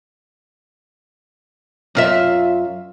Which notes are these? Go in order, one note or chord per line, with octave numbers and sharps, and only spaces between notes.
F#2 F4 E5